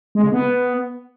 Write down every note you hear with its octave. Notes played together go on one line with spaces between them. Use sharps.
G#3
C#3
B3